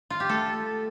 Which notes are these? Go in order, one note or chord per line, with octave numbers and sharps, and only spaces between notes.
F4
G4
A3 A4